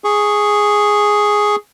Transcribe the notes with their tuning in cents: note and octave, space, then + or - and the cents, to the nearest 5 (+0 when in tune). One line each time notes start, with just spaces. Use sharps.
G#4 +0 C#6 +0